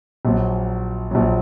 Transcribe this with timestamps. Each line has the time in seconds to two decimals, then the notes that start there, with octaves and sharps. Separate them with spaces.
0.25 A#1 A#2 F#3
1.11 A#1 A#2 F#3